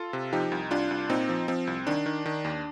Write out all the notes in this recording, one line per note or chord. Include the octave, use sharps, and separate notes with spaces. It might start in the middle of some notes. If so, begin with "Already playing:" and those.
Already playing: F4 A4
C3
F3 D#4 G4
C2
C2 D4 F4
C2
A#2 C4 D#4
F3
F3 C4
C2
D#3 D4
D#3
D#3
D#2